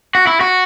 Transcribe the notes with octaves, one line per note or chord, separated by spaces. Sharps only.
F#4
E4
F#4